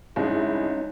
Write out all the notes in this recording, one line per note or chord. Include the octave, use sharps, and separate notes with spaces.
F#1 C2 G#3 C#4 D#4 E4